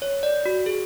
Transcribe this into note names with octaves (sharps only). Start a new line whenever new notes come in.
C#5
D5
F#4
G#4